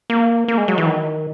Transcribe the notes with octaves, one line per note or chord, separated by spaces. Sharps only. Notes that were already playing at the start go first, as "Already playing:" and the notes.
A#3
A#3
G#3
F#3
E3
D#3